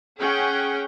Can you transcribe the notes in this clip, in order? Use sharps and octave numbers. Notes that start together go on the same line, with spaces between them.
C#4 G#4 F#5 G5